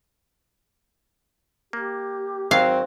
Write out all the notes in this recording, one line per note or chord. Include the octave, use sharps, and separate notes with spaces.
A#3 G4
G#1 F#3 C4 F5